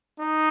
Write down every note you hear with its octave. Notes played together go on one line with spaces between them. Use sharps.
D#4